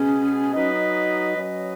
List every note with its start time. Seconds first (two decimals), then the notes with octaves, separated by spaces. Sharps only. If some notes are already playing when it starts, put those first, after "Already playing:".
Already playing: B2 G#3 B3 C#4 G#4
0.53 F#3 D#4 B4 D#5
1.37 F#3 C#4 B4 D#5